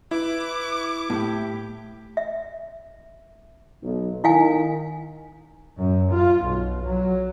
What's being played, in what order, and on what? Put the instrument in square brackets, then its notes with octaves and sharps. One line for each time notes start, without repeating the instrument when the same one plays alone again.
[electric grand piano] E4 [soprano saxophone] B4 [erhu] D6
[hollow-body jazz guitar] A2 [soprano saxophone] G4
[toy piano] E5
[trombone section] B1
[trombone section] D#3 [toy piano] E4 F5 G#5
[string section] F#2
F4
B1
F#3